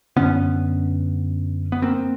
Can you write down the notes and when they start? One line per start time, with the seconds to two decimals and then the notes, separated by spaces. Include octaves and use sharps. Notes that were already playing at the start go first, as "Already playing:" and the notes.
0.16 F#2 D3 B3 C#4
1.72 B3
1.82 A#3 C4